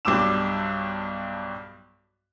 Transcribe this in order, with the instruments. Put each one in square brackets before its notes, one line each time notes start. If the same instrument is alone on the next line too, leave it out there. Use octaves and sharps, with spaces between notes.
[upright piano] B1 G2 G3 D6 E6 E7